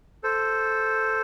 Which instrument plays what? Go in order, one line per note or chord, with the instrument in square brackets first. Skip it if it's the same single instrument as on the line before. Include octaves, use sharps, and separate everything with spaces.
[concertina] A4 C5